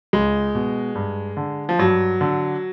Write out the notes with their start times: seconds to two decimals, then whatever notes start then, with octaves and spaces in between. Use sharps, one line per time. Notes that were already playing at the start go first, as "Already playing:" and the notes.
0.13 C#2 G#3
0.55 B2
0.95 G2
1.37 D3
1.69 F3
1.79 G2 F#3
2.21 D3